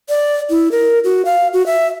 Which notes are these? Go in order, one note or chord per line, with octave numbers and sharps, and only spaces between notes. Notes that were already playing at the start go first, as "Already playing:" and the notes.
D5
E4
A#4
F#4
F5
F#4
E5